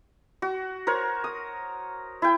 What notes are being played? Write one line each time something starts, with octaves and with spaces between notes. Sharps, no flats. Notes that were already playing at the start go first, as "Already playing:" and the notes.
F#4
A#4 C5 C#5
D#6
E4 G5